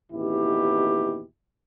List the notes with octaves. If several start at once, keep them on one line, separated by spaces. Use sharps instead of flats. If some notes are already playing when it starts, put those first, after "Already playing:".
A1 D#2 B2 E4 G4